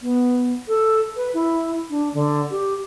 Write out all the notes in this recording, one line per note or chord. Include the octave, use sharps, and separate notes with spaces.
B3
A4
B4
E4
D4
D3
G4